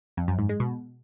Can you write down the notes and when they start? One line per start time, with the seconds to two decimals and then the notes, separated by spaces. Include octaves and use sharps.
0.17 F2
0.28 F#2
0.39 G#2
0.49 G#3
0.60 B2